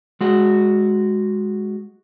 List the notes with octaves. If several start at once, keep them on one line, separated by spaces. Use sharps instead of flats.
G#3 F#4